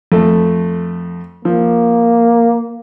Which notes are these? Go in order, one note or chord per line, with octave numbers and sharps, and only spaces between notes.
F2 A3
F3 A#3